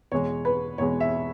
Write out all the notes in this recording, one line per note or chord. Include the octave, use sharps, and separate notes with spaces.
E2 B2 G#3 C#5
B4
E2 B2 G#3 C#5
E5